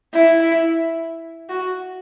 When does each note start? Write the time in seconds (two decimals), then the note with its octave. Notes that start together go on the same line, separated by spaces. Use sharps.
0.15 E4
1.49 F#4